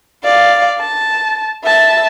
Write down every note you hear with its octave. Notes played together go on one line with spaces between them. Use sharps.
D5 F5
A5
E5 A5